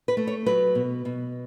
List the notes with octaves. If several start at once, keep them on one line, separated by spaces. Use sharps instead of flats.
B4
A3
C#5
F#3 B4
B2
B2